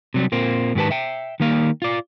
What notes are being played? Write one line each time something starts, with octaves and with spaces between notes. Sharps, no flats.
C3 F#3 G3
A#2 A#3 C4
G#2 D#3 G4 B4 A5
E5 G5
D#3 G3 A#3 F5
F4 D5